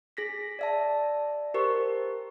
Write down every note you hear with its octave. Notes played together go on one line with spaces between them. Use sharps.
G#4 A#6 B6
D5 E5 A5
G4 A#4 C5 C#6